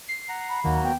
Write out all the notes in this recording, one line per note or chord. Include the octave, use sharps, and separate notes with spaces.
C7
F#5 A#5
B5
D#2 D#3 F#3 A#3 F#4
B3 G5